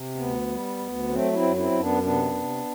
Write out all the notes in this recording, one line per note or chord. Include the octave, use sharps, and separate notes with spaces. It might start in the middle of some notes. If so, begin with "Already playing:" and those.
Already playing: C3
D2 B3
G3
D2
F#3 A3 C4
C4 E4
F#2
C4 E4
F#2
B3 D4
C3 B3 D4
C3